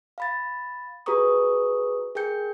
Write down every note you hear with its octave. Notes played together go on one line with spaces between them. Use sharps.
F5 B5 A6
F#4 G#4 B4 A#5 C#6 D#6
G#4 A#4 G5 G6 C#7